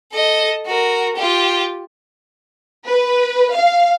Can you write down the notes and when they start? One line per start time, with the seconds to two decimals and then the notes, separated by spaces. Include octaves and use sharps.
0.13 A4 D#5
0.66 F#4 A#4
1.16 F4 G4
2.87 B4
3.54 F5